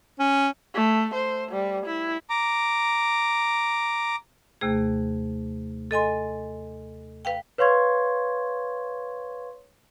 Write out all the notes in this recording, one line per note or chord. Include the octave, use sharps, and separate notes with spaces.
C#4
A3
C5
G3
E4
A#5 D6
D#2 C3 A3 G#4
A4 D#5 G#5 C6
B4 F5 G5
B4 C#5 F5 C6 C#6 G#6